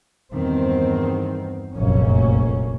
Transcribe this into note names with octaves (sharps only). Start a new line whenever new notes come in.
E2 G2 D#3 C4
F1 A#1 F#2 A#3 C#4